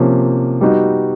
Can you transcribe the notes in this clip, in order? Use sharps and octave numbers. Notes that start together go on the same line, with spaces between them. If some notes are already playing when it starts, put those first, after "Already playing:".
Already playing: C3 F3 A#3 C#4
G3 B3 D#4 F#4